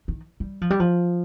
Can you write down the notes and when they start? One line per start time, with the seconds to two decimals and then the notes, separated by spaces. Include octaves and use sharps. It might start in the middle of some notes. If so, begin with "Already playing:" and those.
0.08 D#3
0.40 G3
0.61 F3
0.70 G3
0.80 F3